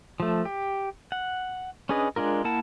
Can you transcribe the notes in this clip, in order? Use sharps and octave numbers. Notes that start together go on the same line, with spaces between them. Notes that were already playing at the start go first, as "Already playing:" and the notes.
F3 A3
G4
F#5
C#4 D4 G#4 B4 D#5
G#3 D4 F4 A#4
A#3 E4 A#4 F#5 A5